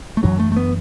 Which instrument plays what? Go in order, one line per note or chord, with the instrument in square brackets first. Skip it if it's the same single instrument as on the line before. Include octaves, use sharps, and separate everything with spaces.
[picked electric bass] A3
[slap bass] F#2 E3 D4 [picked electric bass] F#3
[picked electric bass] A3
A3
B3